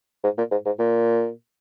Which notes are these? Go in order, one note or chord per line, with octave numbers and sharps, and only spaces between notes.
G#2
A#2
G#2
G#2
A#2